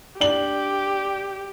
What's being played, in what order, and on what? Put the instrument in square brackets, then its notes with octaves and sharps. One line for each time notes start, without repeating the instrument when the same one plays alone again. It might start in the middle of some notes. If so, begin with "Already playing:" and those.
[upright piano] D4 F#7 [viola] G4